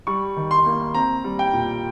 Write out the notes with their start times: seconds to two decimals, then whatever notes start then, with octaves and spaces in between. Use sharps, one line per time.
0.07 G3 C#6
0.36 D#3
0.51 C6
0.66 A#3
0.94 C4 A#5
1.24 G3
1.39 G5
1.54 A#2